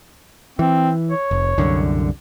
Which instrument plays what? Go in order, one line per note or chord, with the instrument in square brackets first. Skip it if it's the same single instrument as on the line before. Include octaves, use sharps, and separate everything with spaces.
[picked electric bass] E3 [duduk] C4
[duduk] C#5
[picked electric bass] F1
C2 F#2 D3